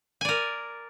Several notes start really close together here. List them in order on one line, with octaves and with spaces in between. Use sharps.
G#5 D5 A#4